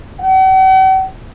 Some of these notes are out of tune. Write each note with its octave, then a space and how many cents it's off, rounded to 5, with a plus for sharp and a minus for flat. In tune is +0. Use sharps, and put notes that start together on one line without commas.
F#5 +45